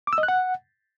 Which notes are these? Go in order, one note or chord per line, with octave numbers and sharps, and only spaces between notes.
D6
E6
D#5
F#6
F#5